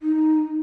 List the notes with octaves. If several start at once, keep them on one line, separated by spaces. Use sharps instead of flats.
D#4